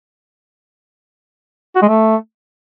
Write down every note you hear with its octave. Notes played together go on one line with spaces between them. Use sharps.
F#4
G#3
A3